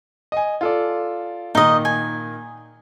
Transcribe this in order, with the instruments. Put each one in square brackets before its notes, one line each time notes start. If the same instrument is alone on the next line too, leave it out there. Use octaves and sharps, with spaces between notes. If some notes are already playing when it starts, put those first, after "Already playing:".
[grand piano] D#5 G#5
F4 A4 D5
[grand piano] A#2 D#3 [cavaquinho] D#4 D#5
[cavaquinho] G#5